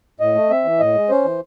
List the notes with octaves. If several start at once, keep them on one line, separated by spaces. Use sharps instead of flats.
A2 D#5
A3
C4 E5
E3
A2 D#5
G#3
C#4 C5
E3